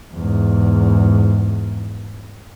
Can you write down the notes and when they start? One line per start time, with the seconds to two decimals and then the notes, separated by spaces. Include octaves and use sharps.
0.13 E2 G#2